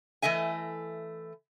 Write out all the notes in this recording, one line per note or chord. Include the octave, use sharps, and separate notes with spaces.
E3 A3 D#5 E5 G#5